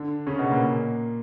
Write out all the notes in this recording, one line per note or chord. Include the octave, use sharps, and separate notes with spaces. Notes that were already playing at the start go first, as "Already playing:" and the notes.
Already playing: D3 D4
C#3 C#4
B2 B3
A#2 A#3